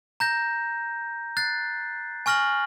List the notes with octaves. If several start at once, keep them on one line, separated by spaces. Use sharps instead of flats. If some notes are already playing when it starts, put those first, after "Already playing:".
A#5 G6 A#6
F#6 A6 C7
G#5 C#6 F6 A#6 F#7